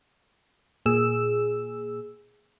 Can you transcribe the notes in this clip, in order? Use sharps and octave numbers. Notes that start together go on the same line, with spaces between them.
A#2 G#4 E6